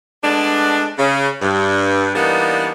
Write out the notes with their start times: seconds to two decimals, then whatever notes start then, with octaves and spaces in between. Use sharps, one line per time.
0.23 G#3 A3 B3 D4
0.98 C#3
1.42 G2
2.15 E3 G3 A#3 B3 D4 D#4